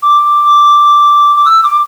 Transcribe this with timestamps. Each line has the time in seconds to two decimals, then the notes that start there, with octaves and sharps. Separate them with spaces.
0.03 D6
1.36 D6
1.45 E6
1.63 D6